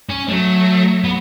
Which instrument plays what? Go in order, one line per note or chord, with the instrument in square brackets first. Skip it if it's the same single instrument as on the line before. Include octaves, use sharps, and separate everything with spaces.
[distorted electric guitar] C#4
[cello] F#3 [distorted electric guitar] A3
[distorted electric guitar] B3